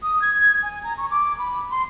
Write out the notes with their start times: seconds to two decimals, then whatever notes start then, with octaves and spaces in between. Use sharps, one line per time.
0.03 D#6
0.22 G#6
0.63 G#5
0.84 A#5
0.98 C#6
1.11 D6
1.39 B5
1.71 C6